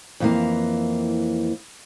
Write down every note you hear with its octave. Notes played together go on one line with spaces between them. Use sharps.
F2 E3 A#3